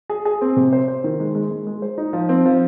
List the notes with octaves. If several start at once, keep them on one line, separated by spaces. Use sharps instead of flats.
G#4
G#4
C4
C3
C5
C5
D#3
G#3
G#3
G#3
G#3
C5
D#4
F3
C4
F3